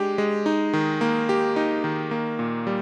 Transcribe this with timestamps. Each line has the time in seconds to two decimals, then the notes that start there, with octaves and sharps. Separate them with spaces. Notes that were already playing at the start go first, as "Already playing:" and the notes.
Already playing: G#3 D4 G4
0.18 G#3
0.46 D#4
0.73 D#3
1.01 A#3
1.29 G4
1.56 D#4
1.84 D#3
2.11 A#3
2.39 A#2
2.67 G3